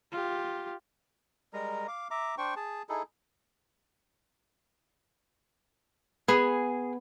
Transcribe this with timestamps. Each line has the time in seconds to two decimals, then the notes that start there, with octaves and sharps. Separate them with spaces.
0.12 F4 G4
1.53 G3 G#3 A#4 A#5
1.88 F5 D6
2.11 E5 A#5 D6
2.38 D4 C5 G5 C#6
2.56 G#4 A5
2.89 D#4 E4 G#4 A4
6.28 B3 G#4